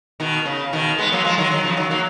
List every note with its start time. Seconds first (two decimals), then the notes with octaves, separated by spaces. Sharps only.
0.20 B2 D#3
0.45 C#3
0.73 B2 D#3
0.98 G#3 B3
1.12 F#3 A#3
1.24 F3 G#3
1.38 D#3 F#3
1.51 D#3 F#3
1.64 C#3 F3
1.77 D#3 F#3
1.91 F#3 A#3